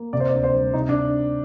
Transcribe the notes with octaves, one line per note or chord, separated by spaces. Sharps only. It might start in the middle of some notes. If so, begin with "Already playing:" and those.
Already playing: A#3
C3 D5
C5
D5
D2
C5
G3
C3 D#4
D4